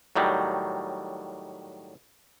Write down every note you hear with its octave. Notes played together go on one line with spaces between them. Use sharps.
A2 D#3 F#3 G3